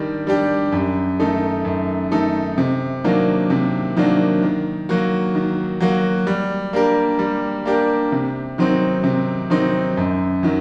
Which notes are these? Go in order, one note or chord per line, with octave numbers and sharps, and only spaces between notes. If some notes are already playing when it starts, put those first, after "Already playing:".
Already playing: D#3 G3 D4 G4
G3 D4 G4
F#2
D#3 A3 D#4 A4
F#2
D#3 A3 D#4 A4
C3
D#3 F#3 A#3 D4
C3
D#3 F#3 A#3 D4
D#3
F#3 A#3 F#4
D#3
F#3 A#3 F#4
G3
A#3 D4 G4 A#4
G3
A#3 D4 G4 A#4
C3
D#3 F#3 C4 D#4
C3
D#3 F#3 C4 D#4
F#2
D#3 F#3